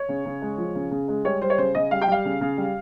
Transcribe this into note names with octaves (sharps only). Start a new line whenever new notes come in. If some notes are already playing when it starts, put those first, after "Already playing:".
Already playing: C#5
C#3
C#3
G#3
F3
C#3
C#3
G#3
G3 C#5
G3 C5
C#5
C#3 C5
C#3 D#5
G3 F5
G5
G3 F5
C#3
C#3
G3